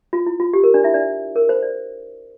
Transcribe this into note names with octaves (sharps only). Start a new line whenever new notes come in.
F4
E4
F4
G4
A#4
D4 D5
E4 E5
D4 D5
A#4
C5
D5